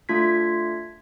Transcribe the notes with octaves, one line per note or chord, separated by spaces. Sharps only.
A3 D4 F4 G#6 B6